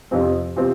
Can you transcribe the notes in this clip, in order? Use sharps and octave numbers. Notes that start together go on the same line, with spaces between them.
F2 C3 F3 C4
C3 F3 C4